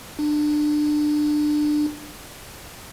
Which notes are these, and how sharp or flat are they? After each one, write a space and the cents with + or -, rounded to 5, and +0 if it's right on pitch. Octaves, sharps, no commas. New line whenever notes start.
D4 +25